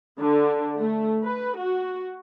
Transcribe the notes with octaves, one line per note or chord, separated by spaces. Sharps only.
D3
A3
B4
F#4